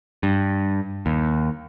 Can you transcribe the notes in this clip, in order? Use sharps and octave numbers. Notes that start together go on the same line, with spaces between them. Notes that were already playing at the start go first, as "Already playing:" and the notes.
G2
D#2